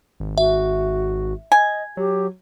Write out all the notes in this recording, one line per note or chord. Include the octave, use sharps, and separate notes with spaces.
G#1
F#4 E5
D#5 G#5
F#3 G4